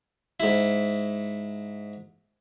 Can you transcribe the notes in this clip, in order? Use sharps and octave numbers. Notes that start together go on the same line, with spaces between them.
G#2 E4